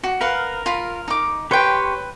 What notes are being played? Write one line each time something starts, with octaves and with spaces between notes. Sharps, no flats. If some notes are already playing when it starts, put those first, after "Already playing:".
F#4
A#4 B4 F5 F#5
F4 B5
D#4 D6
G4 B4 C#5 G5 C6